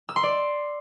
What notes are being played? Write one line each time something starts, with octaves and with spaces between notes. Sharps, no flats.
E6
C6
D5